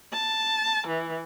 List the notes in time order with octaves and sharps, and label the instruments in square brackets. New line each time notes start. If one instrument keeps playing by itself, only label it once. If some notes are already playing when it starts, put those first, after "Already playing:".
[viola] A5
E3